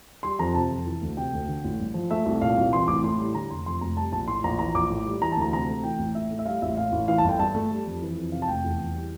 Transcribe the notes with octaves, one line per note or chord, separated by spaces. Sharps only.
G3 C6
F2 A#5
C3 A5
F2
E3
D2
C3 G5
D2
D3
A1
G2
F3
A3 E5
C2
A#2 F5
C2
E3 C6
A1 D6
A2 C6
G3
D3 A#5
F1 C6
F2 C6
F1 A#5
G3 A5
A#1 A5
A2 C6
A#1 A#5
E3 A#5
A#1 D6
A2
G3
E3 A#5
D2 A5
A#5
C3 A#5
A3
E3 G5
A1
A2 E5
A3
E5
G3 F5
A1 E5
A2 F5
A1
E3 F5
A5
G1 G5
G2 A5
A3
G3
F2
E3
F2
C3 F5
A5
F1 G5
E2
E3
G3